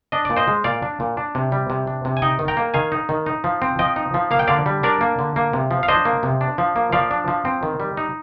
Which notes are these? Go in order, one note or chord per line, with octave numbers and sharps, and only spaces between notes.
D4 D#5
A#2 D5
C5 D#5
G#3
A#2 D5 F5
D4
A#2
D4
C3
G3
C3
D4
C3
G#5
D#4 D#5 G5
D#3
G5 A#5
A#3
D#3 F5 G#5
D#4
D#3
D#4
F3
C4
F3 D#5 G5
D#4
F3
A#3 F5
G5
D3 D5 F5
G3
D4 A#4 D5
A#3
D3
A#3
C3
F3
F5
D4 C5 D#5
A#3
C3
D4
F3
A#3
F3 D5 F5
D4
F3
C4
D#3
G3
D#4